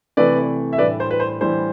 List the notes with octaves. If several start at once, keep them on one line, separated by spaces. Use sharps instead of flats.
C3 E3 A3 B4 D5
E5
A2 E3 G3 D4 B4 D5
C5
B4
C5
A2 E3 G3 D4 C5